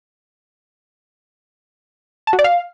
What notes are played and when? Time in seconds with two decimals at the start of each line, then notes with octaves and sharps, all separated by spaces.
2.27 A5
2.33 F#4
2.39 D5
2.44 F5